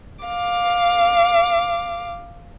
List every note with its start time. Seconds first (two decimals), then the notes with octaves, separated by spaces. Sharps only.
0.24 F5 D6